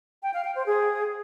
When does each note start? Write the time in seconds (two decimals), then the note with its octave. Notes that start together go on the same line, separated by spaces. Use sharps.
0.23 G5
0.34 F5
0.44 G5
0.55 C5
0.66 G#4